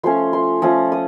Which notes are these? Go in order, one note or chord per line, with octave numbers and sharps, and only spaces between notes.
F3 A3 C#4 C6
C6
F3 A3 C#4 D#6
D#6